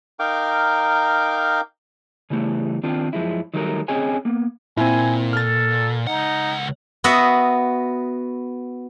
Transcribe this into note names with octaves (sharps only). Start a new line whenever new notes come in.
D#4 A#4 F5 G5 D6
C#3 E3 G3 A3
D#3 C4 D4 F4
F#2 F3 G#3 E4
D#3 F#3 G3 A3 G#4 A#4
C4 C#4 G#4 C#5 D#5 G#5
A#3 B3
A#2 C4 E4 G#5
A4 F6 A6
C#2 D#4 F#5
B3 F#4 D#5 E5 F#5